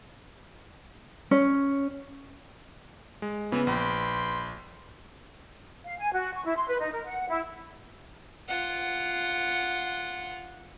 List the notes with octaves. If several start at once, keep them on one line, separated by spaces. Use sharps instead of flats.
C#4
G#3
C#3 E3 B3 E4
A#1 B4 G5 B5 C6
F5
G#5
F#4
C#6
E4
C6
B4
D#4
A#4
F#5
E4
F4 F#5